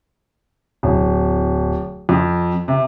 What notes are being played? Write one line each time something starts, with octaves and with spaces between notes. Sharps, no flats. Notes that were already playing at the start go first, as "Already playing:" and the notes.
D1
F2
C3